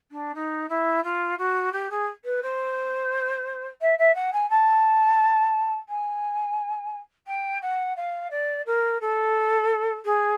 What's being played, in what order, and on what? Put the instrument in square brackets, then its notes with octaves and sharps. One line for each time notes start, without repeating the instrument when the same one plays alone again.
[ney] D4
D#4
E4
F4
F#4
G4
G#4
B4
C5
E5
E5
F#5
G#5
A5
G#5
G5
F#5
F5
D5
A#4
A4
G#4